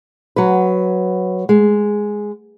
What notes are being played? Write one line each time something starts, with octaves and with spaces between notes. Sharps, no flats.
F#3 B4
G#3